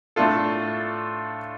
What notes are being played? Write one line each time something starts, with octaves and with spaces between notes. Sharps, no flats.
A2 A3 D4 F4 A4